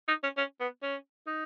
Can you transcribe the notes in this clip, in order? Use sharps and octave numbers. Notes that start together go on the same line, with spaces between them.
D#4
C#4
C#4
B3
C#4
D#4